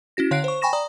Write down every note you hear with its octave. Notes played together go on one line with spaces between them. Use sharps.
C#4 E4 F#4 A#6
D3 C#5 F5 F#6 C7 D7
C5 C#6
G5 G#5 B5 C#6 A#6 E7
D5 A#5 D#6